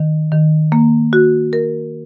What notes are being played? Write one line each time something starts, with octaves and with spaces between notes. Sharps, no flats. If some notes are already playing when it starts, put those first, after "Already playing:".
Already playing: D#3
D#3
A#3
F#4
A#4